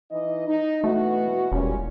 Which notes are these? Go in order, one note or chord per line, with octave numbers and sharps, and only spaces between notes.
E3 D#4 D#5
D#4
B2 E3 A3 F#4
E1 A#2 G3 C#4